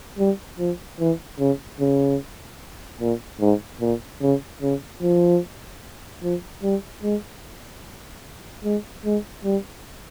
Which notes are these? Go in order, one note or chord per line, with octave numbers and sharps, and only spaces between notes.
G3
F3
E3
C#3
C#3
A#2
G#2
A#2
C#3
C#3
F3
F3
G3
G#3
G#3
G#3
G3